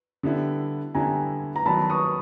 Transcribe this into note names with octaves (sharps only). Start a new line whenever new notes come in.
D3 G3 B3 E4
D3 G3 B3 E4 G#5 A#5
A#5
D#3 F#3 B3 A5 B5
C#6 D#6